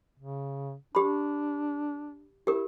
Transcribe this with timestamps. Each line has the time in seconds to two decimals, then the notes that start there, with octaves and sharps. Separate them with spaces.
0.19 C#3
0.95 D4 G4 B5
2.47 E4 G4 A#4